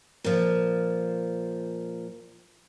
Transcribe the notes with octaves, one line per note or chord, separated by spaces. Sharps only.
A#2 F3